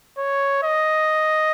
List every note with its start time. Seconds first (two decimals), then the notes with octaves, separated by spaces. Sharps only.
0.18 C#5
0.63 D#5